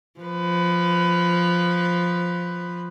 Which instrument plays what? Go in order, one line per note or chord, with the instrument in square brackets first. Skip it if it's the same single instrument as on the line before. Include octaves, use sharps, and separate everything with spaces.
[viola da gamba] F3 B4